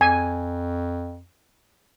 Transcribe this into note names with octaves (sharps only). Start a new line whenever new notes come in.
F2 G#5